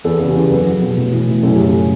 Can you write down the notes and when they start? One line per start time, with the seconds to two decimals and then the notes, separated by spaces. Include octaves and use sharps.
0.04 E2 A4
0.20 C#3
0.27 G4
0.35 E2
0.51 F#3 B4
0.67 F#3
0.82 B2
0.97 A2
1.12 E3
1.28 A2
1.43 F#2 A4
1.55 C#3 G4
1.68 A4